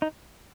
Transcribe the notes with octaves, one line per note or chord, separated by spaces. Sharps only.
D#4